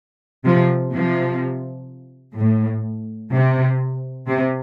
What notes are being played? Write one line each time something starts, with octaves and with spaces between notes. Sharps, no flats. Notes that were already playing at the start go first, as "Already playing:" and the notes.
C3 F3
C3 F3
A2
C3
C3